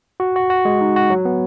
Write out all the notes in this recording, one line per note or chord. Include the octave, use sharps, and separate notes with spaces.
F#4
F#4
F#4
G#3
D#4
F#4
F#3
B3